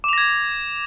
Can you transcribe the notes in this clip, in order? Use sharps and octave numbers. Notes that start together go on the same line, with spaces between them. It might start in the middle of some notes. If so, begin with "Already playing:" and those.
D6 G#6 A#6 F7